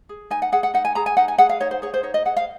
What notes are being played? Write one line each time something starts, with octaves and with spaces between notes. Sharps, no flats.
G#4
D#4 G#5
F#5
G#4 F#5
F#5
D#4 F#5
G#5
G#4 A#5
G#5
D#4 F#5
G#5
G#4 F#5
F5
D#4 C#5
C5
G#4 C#5
C5
D#4 C#5
D#5
G#4 F#5
F5